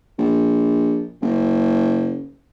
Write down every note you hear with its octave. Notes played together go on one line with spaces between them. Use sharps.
A#1
F#1